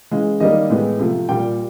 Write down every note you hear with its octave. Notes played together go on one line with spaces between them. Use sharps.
C#3 E3 G#3
D#3 G3 A#3 D#5
A2 E3 G#3 B3
C3 F3 A3
A#2 G3 A#3 G5